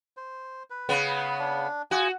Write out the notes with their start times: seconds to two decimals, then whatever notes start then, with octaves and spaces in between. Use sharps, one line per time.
0.17 C5
0.70 B4
0.89 C#3 B3
1.39 D4
1.91 F4 F#4 G#4 G#5